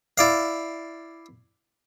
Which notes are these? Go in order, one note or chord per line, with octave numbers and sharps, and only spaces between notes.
E4 D5 F5